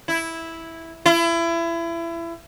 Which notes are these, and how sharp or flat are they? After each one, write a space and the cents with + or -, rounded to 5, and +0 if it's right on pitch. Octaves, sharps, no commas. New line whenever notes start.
E4 -5
E4 +30